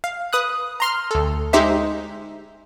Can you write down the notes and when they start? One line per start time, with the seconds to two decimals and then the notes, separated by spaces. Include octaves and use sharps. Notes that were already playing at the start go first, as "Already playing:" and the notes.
0.04 F5
0.33 B4 D#6 F#6
0.80 A#5 C6 F6
1.11 D2 A4
1.53 G#3 D#4 G4 C5 E5